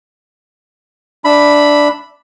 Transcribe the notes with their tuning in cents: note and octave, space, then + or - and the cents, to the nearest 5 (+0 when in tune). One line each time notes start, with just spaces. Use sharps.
D4 +0 E5 +0 B5 +0